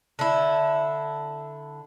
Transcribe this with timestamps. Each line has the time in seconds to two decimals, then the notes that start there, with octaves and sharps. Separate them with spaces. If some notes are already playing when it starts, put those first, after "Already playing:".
0.19 D3 E4